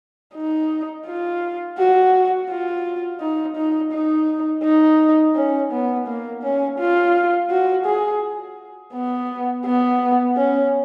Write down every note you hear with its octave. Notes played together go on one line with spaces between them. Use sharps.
D#4
F4
F#4
F4
D#4
D#4
D#4
D#4
C#4
B3
A#3
C#4
F4
F#4
G#4
B3
B3
C#4